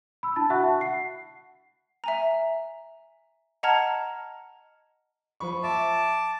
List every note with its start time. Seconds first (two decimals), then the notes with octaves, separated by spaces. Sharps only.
0.23 B5 E6
0.36 D4 E4 A5 A6
0.50 F#4 E5 F#5 B5 C#6 F#6
0.64 A5
0.81 F#5 C7
2.04 E5 G#5 A#5
3.63 D#5 F#5 A5 A#5 F6 G#6
5.40 F3 B5 C#6
5.63 E5 A5 D6